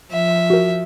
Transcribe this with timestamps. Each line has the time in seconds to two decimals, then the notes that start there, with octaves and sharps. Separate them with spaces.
0.11 F3 E5
0.50 F#4 A#4